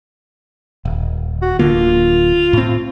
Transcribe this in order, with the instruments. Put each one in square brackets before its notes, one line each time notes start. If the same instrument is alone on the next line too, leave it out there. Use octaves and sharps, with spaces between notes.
[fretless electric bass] D#1
[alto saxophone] F#4
[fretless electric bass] D1 D3 A#3 [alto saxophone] F4
[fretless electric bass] A2 C4